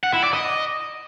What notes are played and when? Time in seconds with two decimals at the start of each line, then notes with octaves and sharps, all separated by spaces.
0.03 F#5
0.13 E4
0.23 D5
0.33 D#5